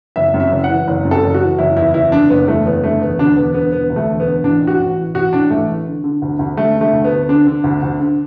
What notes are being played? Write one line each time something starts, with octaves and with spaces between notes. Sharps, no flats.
F#1 E5
F#2
E5
F#1
F#5
E3
F#1
F#2
A4
F#1
F#4
E3
F#1 E4
E2 E4
F#1 E4
D3 D4
F#1 B3
E2 A3
F#1 B3
D3 A3
E1 B3
D2 D4
E1 B3
D3 B3
E1 B3
D2
A3
E1
B3
D3
A1 D4
A2
F#4
A1
E3
A1 F#4
A2 D4
A1 A3
E3
D3
D3
D2
D2
D3 A3
D3
A3
D2
B3
D2
D3 D4
D3
D2
D2
D3